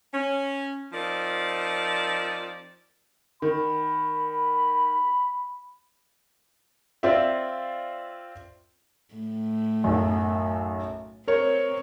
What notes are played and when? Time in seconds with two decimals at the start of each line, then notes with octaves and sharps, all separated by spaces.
0.13 C#4
0.93 F3 C4 D#4 A#4 D5
3.42 D#3 B5
7.03 C4 F4 C5 D5 E5
9.14 A2 A3
9.84 B1 F#2
11.28 C4 A#4 C#5